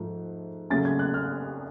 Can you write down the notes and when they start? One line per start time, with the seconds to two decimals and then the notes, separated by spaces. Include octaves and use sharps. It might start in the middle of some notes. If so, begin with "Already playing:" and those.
Already playing: G#2 F3 A3
0.70 C#3 F#3 A3 C#4 A6
0.85 G#6
0.99 F#6
1.14 F6